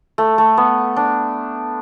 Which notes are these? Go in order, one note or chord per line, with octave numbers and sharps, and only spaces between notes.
A3
A3
B3
D4